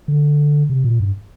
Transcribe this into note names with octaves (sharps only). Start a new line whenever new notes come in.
D3
C3
A#2
G2